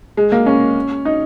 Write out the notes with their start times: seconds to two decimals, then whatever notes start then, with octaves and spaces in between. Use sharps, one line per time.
0.17 G#3
0.32 A#3
0.46 C#4
1.05 D#4